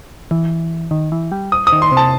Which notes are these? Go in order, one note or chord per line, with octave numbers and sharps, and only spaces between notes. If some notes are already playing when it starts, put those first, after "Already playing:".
E3
D#3
E3
G3
D#6
D#6
D#3
C6
C3
A5